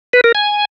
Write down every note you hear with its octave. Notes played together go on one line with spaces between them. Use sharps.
B4
A#4
G#5